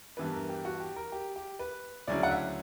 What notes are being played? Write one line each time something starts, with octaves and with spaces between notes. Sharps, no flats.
G2 E3 B3 E4 B4
A#4
G4
F#4
G4
A#4
G4
G4
B4
D2 C#3 F#3 C#4 E4 D5
F#5
E5